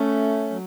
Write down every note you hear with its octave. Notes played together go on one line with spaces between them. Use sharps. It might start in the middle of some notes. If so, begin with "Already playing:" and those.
Already playing: A3 C#4
F#3